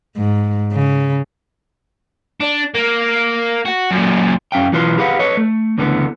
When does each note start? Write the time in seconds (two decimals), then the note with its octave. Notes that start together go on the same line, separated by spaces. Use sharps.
0.17 G#2
0.73 C#3
2.40 D4
2.74 A#3
3.65 F#4
3.91 F#2 A#2
4.52 F#2 C#4 E5 F5 G5
4.73 B1 E3 F4 B4 A#5 C6
4.98 G4 G#4 B4 F5 F#5
5.19 A4 B4 C#5 D#5
5.37 A3
5.78 C#2 D3 E3 A3 B3